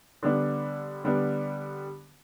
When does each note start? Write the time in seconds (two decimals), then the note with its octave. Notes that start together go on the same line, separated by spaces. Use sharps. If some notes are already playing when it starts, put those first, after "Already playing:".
0.23 D3 G3 B3 D4
1.04 D3 G3 B3 D4